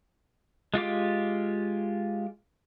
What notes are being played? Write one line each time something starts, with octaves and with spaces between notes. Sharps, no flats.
G#3 F4 G4 D6